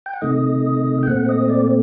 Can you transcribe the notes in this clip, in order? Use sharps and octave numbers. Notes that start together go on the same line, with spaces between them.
G5
F#5
C3 D#3 A3 D#5
G5
A#2 A3 C4 F#5
D#5
D5